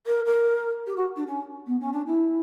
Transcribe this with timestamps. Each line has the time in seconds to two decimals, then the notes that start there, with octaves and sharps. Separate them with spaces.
0.07 A#4
0.26 A#4
0.87 G4
0.96 F#4
1.16 D4
1.27 C#4
1.67 B3
1.80 C#4
1.93 D4
2.07 E4